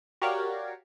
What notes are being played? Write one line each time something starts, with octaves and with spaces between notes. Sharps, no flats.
F#4 G4 A#4 C#5 D5 F5